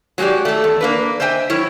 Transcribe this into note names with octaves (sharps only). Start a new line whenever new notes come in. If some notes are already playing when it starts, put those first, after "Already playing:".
F#3 G#3 F#4 G4 D5
A3 A4
E2
A#3 D4 B4
C5 D#5 E5 G5 G#5
F#3 E4 A#4 C#5